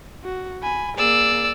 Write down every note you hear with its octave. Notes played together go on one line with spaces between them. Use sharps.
F#4
G#5 B5
A#3 G#4 D5 E6